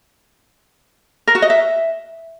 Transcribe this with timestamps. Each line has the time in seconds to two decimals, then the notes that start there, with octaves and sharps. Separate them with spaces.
1.27 A#4
1.35 F#4
1.42 D#5
1.50 E5